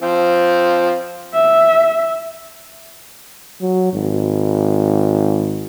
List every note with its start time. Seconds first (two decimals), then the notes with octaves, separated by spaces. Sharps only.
0.02 F3 C4
1.34 E5
3.61 F#3
3.93 G#1